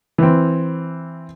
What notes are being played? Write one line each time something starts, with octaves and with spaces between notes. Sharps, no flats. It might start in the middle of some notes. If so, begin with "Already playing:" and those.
E3 C4